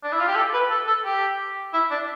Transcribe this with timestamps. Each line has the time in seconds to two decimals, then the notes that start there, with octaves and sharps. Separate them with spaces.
0.04 D4
0.12 E4
0.20 F4
0.28 G4
0.35 A4
0.53 B4
0.70 A4
0.87 A4
1.05 G4
1.74 E4
1.91 D4